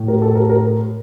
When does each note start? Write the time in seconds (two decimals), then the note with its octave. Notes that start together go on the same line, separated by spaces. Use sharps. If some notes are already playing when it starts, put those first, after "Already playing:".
Already playing: A2
0.08 A#4
0.22 A4
0.35 A#4
0.50 A#4